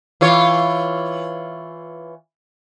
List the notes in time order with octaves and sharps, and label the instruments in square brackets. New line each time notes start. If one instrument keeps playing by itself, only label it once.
[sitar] E3 F4 C#5